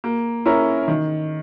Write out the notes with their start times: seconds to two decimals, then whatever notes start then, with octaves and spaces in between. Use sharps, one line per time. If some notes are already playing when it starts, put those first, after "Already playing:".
0.04 A#3
0.46 C#4 E4 A#4
0.88 D#3